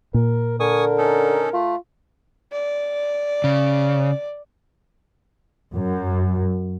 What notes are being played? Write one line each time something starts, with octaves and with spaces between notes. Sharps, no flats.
A#2 A#4
D3 A#4 G#5 C#6 D#6
C#4 D#4 A4
A3 F4
D5
C#3
F#2